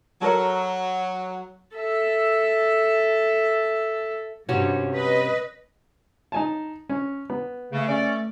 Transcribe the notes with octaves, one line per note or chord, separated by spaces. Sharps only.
F#3 A4 A#4 C#5
A4 E5
G2 C3 C#4 F#4
B4 D#5
D#4 G#5 A5
C#4
B3
C#3 A3
C#4 D5